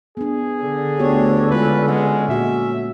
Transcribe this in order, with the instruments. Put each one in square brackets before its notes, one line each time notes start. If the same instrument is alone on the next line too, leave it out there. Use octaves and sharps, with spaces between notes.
[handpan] B3 D4 [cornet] G#4
[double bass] D3
[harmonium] D2 D4 C#5 [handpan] B3 F#4 G4
[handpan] G#3 E4 F4 [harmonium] C#4 [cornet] B4
[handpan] G3 F#5 [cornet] G#3
[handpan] A#2 F#4 [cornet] E5